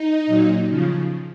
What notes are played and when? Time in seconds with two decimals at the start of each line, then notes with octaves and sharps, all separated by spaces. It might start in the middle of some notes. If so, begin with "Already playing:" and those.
Already playing: D#4
0.27 A#2 F#3
0.68 C#3 F3